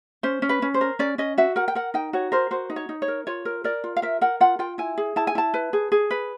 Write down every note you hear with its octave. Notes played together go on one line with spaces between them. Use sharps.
C#4 C5
C#4
B4
C#4
C5
A#4
C#4 D5
C#4 D#5
F#4 E5
A#4 F#5
G5
A#4 F#5
D#4 G5
F#4 C#5
A#4 C5
F#4 C5
D#4
C#5
D#4
C#5
A#4
F4 C#5
A#4
A#4 D5
F4
F5
A#4 E5
A#4 F#5
F4 F#5
F4 G5
E4 G#5
G#4
E4 A5
G#5
E4 A5
B4
G#4
G#4
B4